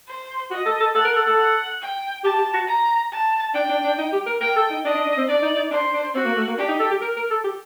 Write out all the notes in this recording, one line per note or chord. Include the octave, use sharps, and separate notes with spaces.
C5
F#4 D#5
A4
A4
A4 F#5
A#4
A4
A4
F#5
G5
G4 A5
G4
F#4
A#5
A5
D4 G5
D4
D4
D#4
G4
A#4
A#4 G5
A4
D#4
D4 D#5
D4
D4
C4
D4 D5
D#4
D#4
D4 C5
D4
C4 F#4
A#3
A3
A#3
D4 G4
D#4
A4
G4
A#4
A#4
A4
G4